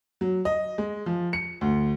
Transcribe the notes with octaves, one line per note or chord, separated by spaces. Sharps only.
F#3
D#5
G#3
F3
C#7
D2